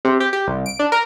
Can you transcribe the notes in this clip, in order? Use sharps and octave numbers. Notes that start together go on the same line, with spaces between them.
C3
G4
G4
C2
D7
D4
A#4